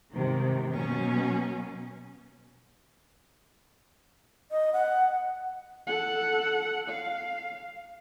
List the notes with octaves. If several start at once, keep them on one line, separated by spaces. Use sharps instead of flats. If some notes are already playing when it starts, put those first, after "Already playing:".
G#2 C3 D#3
B2 F#3 A#3 C#4
D#5
F#5
A4 F#5
F5